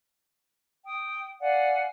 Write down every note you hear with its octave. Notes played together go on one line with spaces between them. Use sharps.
G5 D#6
D5 F5 F#5 G#5